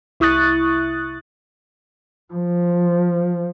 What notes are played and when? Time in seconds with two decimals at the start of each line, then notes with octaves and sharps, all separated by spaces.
0.20 C2 E4 C#6 D#6 F#6 A6
2.34 F3